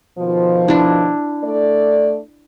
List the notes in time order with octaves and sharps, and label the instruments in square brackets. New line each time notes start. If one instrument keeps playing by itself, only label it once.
[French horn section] B2 D#3 F3
[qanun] D4 E4
[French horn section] A3 A4 D5